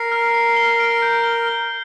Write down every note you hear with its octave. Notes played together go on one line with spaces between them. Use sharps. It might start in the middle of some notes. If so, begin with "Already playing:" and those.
Already playing: A#4 C7
F6
C7
G7
D7
G6
G7
G7